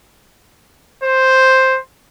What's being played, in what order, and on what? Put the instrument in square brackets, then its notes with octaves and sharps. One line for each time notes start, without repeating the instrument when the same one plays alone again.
[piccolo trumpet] C5